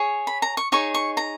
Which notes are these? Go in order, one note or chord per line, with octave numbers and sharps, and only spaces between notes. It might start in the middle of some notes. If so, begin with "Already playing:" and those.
Already playing: G#4 C#5
B5
A#5
C#6
D#4 G#4 C#5 C#6
C#6
A#5